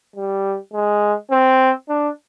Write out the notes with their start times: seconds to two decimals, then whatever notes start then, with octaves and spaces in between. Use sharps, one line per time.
0.16 G3
0.73 G#3
1.31 C4
1.89 D4